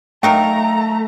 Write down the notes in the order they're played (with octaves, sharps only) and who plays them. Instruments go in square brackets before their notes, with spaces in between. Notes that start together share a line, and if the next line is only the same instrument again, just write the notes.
[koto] F#3 D#4 A#4 [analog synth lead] A3 [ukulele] F5 G5 [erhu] A#5